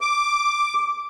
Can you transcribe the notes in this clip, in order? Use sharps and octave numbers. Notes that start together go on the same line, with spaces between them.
D6